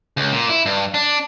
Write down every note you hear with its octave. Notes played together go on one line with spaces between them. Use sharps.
C#2
A#2
E4
G2
D4